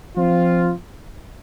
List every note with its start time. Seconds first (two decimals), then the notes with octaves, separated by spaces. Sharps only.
0.16 F3 C4 F4